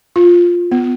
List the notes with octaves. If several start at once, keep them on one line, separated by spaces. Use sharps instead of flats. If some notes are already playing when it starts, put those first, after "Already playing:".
F4
B3